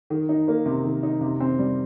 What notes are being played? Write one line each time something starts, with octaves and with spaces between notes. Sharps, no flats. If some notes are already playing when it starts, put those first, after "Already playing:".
D#3
D#4
A#3
C3
D#3
D#4
C3
C4
G3